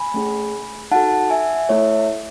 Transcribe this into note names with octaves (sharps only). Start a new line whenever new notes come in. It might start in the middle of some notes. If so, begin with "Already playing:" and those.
Already playing: G#5 B5
A3 C#4 G#4
D#4 F#4 A4 F#5 A5
E5 G#5
A3 E4 A4 C#5 E5